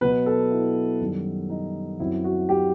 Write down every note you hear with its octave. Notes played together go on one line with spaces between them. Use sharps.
B2 F#3 B3 B4
A4
E4
F#2 D#3 G3
D#4
F#2 F#3 C4 E4
F#4
G4